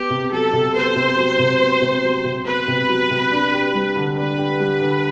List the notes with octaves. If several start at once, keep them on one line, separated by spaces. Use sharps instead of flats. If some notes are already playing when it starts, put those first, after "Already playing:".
Already playing: B3 G4
C3
F#3 A4
C3
B3 C5
C3
F#3
C3
B3
C3
F#3
C3
B3 B4
C3
F#3
C3
D4
G4
G3
D3
D4 B4
G4
G3
D3